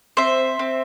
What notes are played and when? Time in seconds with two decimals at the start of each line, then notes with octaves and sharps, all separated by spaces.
0.17 C4 C5 E5
0.59 C4